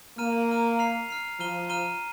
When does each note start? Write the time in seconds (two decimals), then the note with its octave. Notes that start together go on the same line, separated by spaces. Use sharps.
0.18 A#3 A#5 F6 D#7
0.49 A#5 F6 D#7
0.79 F6 C7 F7
1.09 F6 C7 F7
1.40 F3 A#5 F6 D#7 G7
1.69 A#5 F6 D#7 G7